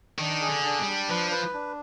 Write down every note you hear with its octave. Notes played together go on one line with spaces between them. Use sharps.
D#3 D4
G#4
D3
D4
G3
D4
F3 B4
B4
D4